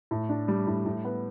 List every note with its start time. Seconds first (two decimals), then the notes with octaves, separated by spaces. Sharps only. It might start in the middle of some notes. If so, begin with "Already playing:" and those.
0.11 A2
0.29 D4
0.48 G3
0.67 A2
0.86 A2
1.05 B3